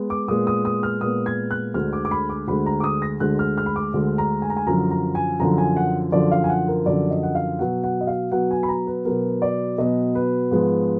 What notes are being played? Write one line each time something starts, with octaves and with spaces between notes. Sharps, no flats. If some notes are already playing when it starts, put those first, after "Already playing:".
Already playing: G#3 B3
D6
A#2 G#3 B3 D#6
D#6
D#6
F6
A#2 G#3 B3 D#6
G#6
F#6
D2 D3 G#3 F6
D6
D6
B5
D6
D2 D3 G#3 B5
A#5
D6
D#6
A#6
D2 D3 G#3 F#6
F6
F6
B5
D6
D2 D3 G#3
A#5
G#5
A#5
G#5
F#2 D3 F3 A#5
A#5
G#5
F#2 D3 F3 A#5
G#5
F#5
F#2 D3 F3 D5
F5
G#5
F#5
A#4
F#2 D3 F3 D5
D#5
F#5
F5
B2 F#3 B3 F#5
F#5
D#5
F5
B2 F#3 B3 F#5
G#5
B5
A#5
B4
B2 F#3 B3 A#4
D5
B2 F#3 B3 D#5
B4
G#2 F3 G#3 B3